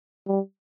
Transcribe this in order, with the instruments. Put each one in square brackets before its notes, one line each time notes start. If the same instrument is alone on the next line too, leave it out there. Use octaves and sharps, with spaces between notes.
[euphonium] G3